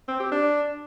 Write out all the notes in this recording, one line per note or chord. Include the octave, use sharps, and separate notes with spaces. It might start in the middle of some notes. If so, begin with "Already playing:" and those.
C4
G4
D4